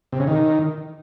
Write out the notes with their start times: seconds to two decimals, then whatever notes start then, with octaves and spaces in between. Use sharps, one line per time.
0.12 C3
0.20 C#3
0.27 D#3